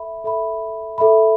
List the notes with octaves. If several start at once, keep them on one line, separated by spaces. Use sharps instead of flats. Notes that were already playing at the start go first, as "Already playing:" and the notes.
Already playing: A4 E5 B5
A4 E5 B5
A4 E5 B5